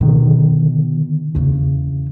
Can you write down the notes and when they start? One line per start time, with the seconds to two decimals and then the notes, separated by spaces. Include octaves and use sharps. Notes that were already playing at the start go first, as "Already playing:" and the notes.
0.01 B2 D3 D#3
1.35 E2 C#3